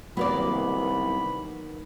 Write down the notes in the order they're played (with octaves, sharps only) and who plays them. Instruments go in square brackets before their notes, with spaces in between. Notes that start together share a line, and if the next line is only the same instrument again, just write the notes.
[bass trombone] C2 [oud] D#3 A#3 D5 [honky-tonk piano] F#3 B3 [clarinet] B5